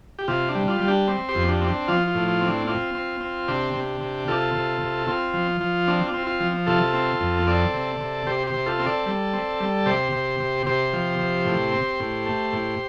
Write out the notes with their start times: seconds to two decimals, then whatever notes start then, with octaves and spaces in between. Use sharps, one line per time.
0.19 G4
0.28 C3 F4
0.49 D4
0.55 G3
0.68 F4
0.81 G3
0.88 D4 G4
1.08 C4
1.29 G4 C5
1.35 F2
1.48 D4 G4
1.61 C4
1.68 D4
1.88 F3 F4
2.08 F4
2.14 A2
2.28 F4
2.41 C4
2.47 D4
2.67 C4 F4
2.95 C4
3.21 C4
3.48 C3 D4 G4
3.74 C3
4.01 C3
4.28 C3 F4 A4
4.55 C3
4.81 C3
5.07 C4 F4
5.34 F3
5.61 F3
5.88 C4 D4
6.07 F4
6.14 C4
6.27 F4
6.40 F3
6.66 C3 F4 A4
6.94 C4
7.20 F2
7.47 C4 A4 D5
7.74 C3
8.00 C3
8.27 C3 G4 C5
8.47 G4 C5
8.54 C3
8.66 F4 A4
8.79 C4
8.86 A4 D5
9.06 G3
9.33 C4
9.60 G3
9.86 C3 G4 C5
10.12 C3
10.40 C3
10.66 C3 G4 C5
10.93 F3
11.19 C3
11.45 A2
11.72 C4
12.00 A2
12.26 A3
12.52 A2